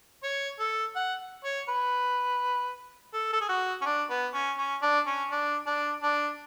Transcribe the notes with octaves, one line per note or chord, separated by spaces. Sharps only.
C#5
A4
F#5
C#5
B4
A4
A4
G#4
F#4
C#4
D4
B3
C#4
C#4
D4
C#4
D4
D4
D4